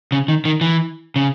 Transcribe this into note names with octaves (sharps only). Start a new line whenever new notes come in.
C#3
D#3
D#3
E3
C#3